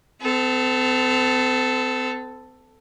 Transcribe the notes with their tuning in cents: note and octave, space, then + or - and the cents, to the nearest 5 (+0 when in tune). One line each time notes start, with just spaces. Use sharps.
C4 -45 A4 +0